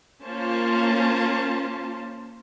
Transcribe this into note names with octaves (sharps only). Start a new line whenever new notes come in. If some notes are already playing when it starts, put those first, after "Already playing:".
A#3 C#4 F4 C5 A5